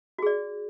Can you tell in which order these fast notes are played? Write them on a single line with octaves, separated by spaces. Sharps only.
F#4 G#4 D5